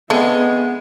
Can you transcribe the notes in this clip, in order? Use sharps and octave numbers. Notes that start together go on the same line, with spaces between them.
G#3 A3 B3 C4 D4